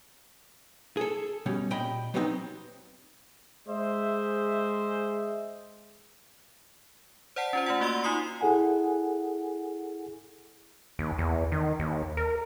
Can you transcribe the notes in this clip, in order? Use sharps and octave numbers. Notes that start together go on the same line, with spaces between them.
G#4 A4
B2 G3 C#4
A#2 D#5 G5 B5
F#3 G3 B3 C4 D#4
G#3 G#4 C5 D#5 E5
C5 D5 F#5 A5 C7
C#4 F4 C5
A3 F4 F#5
A#3 F#4 D5 C6 E6 G7
D#4 F4 D#6 C7
E4 G#4 A4 F#5 G#5
D#2
E2
D#3
D#2
A#4